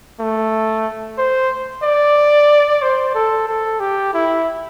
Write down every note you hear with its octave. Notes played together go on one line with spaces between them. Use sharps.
A3
C5
D5
C5
A4
A4
G4
E4